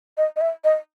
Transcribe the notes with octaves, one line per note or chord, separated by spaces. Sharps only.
D#5
D#5
E5
D#5